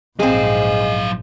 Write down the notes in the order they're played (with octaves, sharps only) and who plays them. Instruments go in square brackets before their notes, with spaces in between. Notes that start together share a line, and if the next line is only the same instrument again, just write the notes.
[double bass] A#1 G#2 [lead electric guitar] F#3 F5 [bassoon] G#3 [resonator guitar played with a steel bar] C4 G#4